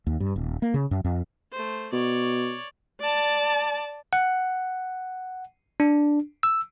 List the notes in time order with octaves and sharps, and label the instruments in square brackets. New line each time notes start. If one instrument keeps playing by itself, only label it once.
[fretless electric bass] D#2
G2
D#1
A#3
C#3
F#2
F2
[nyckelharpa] A3 C5
[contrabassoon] B2 [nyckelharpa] C#5 D5
[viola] D5 A5
[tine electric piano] F#5
D4
E6